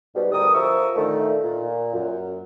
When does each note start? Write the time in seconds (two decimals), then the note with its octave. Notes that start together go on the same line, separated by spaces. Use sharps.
0.15 G#2 B2 G3
0.32 D2 G3 A#4 D#6
0.53 F2 F3 A#4 E5 C#6 E6
0.96 A#2 D3 D#3 A3
1.43 A#2
1.93 F#2